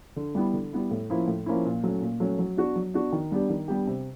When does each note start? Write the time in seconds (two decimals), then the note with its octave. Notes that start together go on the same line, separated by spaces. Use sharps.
0.16 D3
0.35 G3 B3 E4
0.53 D3
0.73 G3 B3 E4
0.91 A2
1.10 F3 A#3 C#4 E4
1.27 A2
1.46 F3 A#3 C#4 E4
1.65 A#2
1.84 F#3 A3 C#4
2.01 A#2
2.20 F#3 A3 C#4
2.39 F#3
2.57 B3 D4 F#4
2.76 F#3
2.94 B3 D4 F#4
3.12 D#3
3.32 G3 B3 D4 G4
3.49 D#3
3.68 G3 B3 D4 G4
3.87 C3